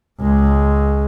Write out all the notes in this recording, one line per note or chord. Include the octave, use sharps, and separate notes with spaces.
C#2 G#3